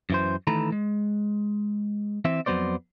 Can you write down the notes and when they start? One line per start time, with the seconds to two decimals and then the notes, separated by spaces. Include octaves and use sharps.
0.10 F#2 E3 C5
0.47 D#3 E3 A3 A4 A#5 B5
0.72 G#3
2.25 E3 C4 E5
2.46 F2 F#3 B3 C5 D5